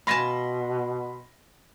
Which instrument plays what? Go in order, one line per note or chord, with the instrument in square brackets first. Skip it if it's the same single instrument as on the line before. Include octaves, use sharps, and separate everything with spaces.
[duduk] B2 [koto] F5 G#5 A5 [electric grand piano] B5 C6 A#6